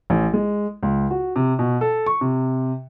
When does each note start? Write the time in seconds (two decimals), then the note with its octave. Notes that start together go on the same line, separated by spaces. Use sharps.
0.10 A1
0.33 G#3
0.83 C#2
1.11 F#4
1.36 C3
1.59 B2
1.81 A4
2.06 C#6
2.21 C3